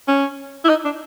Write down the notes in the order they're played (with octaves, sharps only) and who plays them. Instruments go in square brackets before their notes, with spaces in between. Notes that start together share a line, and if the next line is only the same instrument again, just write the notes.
[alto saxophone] C#4
E4
D#4
D4